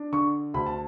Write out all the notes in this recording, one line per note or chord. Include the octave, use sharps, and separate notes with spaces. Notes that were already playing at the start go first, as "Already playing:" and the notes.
Already playing: D4
D3 C#6
D2 B5
A5